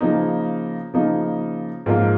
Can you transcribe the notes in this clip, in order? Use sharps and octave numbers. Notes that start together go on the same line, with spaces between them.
C#3 F3 A#3 D#4
C#3 F3 A#3 D#4
G#2 F3 A#3 F4 A#4